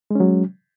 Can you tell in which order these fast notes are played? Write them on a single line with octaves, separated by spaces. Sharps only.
G#3 C#4 F#3